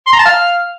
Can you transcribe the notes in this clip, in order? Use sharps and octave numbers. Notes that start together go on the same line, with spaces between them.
C6
A#5
A5
F5